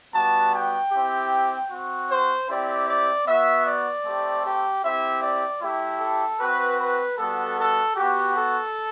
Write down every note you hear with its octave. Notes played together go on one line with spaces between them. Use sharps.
G3 B3 F#4 A5
G5
C4 E4 G4
C4 F#4
C5
C4 E4 G4 D5
D5
B3 F#4 E5
D5
A3 C4 G4
G4
C4 E4 G4 E5
D5
A3 E4 G4
A4
C4 F#4 B4
B4
G3 B3 F#4 A4
A4
B3 F#4 G4
A4